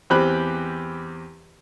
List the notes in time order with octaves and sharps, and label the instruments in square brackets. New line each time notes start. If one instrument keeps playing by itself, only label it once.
[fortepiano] E2 C4 G4 B5 F#6